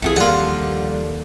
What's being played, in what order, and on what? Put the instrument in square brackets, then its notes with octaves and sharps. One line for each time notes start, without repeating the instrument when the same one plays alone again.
[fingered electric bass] C2 C3 E3 [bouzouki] A3 G4 G#4 [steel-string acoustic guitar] F4
[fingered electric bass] D#2 [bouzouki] D3 [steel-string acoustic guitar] F3 G3 A#3 [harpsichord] F4 F#5